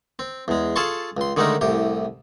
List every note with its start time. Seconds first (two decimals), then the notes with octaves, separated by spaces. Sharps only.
0.19 C4
0.48 E2 G#3
0.76 F4 G#4 A4 A5 C6 C#6
1.17 C#2 C6
1.37 D3 D#3 G#3 A3 D#4 A#4
1.61 C2 A2 G4